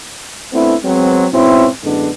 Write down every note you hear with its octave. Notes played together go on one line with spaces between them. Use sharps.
A3 B3 C4 D4 E4
F#3 G#3 B3 C4
G#2 B2 C4 C#4 E4
F#2 A2 D3 G#3 B3 D4